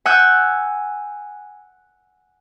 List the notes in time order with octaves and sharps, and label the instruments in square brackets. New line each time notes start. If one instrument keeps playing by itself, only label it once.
[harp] F#5 G#5 E6 F#6 G6